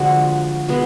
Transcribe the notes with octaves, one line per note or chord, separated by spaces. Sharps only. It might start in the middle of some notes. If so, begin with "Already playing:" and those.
Already playing: D3 F3 G#3 A#3 F#4
B2 G#3 B3